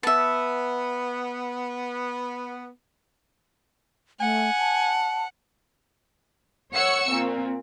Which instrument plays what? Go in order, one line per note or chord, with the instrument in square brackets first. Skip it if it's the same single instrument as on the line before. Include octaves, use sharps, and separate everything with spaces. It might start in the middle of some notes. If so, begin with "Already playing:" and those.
[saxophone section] B3 [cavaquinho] E5 A5
[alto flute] A3 [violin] F#5 [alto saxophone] G#5
[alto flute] A5
[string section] C#5 F#5 C#6 E6 C#7
A#2 C4